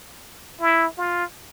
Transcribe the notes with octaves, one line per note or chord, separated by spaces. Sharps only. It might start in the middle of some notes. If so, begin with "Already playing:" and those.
E4
F4